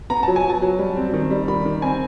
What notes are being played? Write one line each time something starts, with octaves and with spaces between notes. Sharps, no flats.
B3 A#5
F#3 A5
G#5
F#3
A5
F#3
G3
C4
D#3
G3
D#3 B5
D#3
C4 G#5